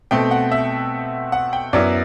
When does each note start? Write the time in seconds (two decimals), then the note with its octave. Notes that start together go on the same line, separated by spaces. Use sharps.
0.11 B2 A3 C4 G5
0.31 F#5
0.52 E5
1.32 F#5
1.53 G5
1.73 F#2 F#3 B3 E4 D5